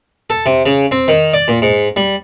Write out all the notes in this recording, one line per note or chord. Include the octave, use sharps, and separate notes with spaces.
A4
C3
C#3
C4
D#3
D5
A#2
G#2
G3